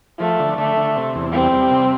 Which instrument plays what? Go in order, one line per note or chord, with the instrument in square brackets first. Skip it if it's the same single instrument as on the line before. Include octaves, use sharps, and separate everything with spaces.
[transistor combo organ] F3 [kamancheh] A3
[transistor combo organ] D3
[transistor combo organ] D3 [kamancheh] A3
[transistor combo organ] D3
C3
E2
[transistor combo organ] G3 [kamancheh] C4
[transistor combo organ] G3
C3